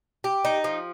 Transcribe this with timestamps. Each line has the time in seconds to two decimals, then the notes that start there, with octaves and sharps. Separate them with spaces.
0.24 G4
0.45 D#4
0.64 F3